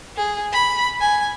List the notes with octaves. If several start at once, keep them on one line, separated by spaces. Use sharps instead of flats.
G#4
B5
G#5